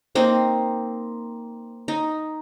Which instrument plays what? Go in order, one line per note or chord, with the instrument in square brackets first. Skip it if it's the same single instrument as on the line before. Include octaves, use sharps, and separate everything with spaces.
[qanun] A#3 C4 D#4
D#4